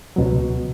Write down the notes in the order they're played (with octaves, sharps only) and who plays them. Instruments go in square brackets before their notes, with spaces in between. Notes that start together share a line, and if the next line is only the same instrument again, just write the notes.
[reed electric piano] C#2 B2 F#3